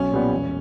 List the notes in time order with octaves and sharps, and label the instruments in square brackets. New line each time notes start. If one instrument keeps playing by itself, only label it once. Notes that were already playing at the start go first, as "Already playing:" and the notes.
Already playing: [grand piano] B1 [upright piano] C#4
[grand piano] A#2 G3 B3
E1